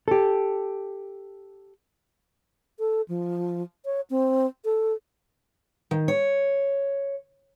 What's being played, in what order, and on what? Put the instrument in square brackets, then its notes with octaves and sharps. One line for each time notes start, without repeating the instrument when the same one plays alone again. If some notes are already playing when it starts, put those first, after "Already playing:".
[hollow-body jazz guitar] G4 A4
[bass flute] A4
F3
C#5
C4
A4
[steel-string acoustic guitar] D#3
C#5